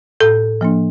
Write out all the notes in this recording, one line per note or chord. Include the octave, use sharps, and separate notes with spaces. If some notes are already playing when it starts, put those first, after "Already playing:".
A2 A4
F3 A#3 D4